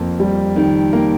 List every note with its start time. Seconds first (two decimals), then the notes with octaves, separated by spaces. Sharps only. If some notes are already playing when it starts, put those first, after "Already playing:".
Already playing: F2 A#3
0.20 G3
0.56 D#3
0.93 A#3